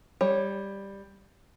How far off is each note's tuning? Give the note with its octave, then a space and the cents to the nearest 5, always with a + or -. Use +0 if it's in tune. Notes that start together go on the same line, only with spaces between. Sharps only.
G3 +10 C#5 -10